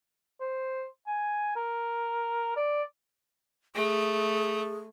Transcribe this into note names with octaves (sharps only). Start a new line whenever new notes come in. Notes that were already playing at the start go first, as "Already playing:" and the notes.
C5
G#5
A#4
D5
A3 G#4